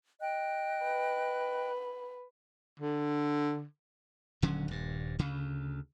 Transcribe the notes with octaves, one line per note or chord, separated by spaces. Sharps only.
D#5 G5 F#6
B4
D3
D#1 D3 F#3 C#4
D#1 G2
D2 C#3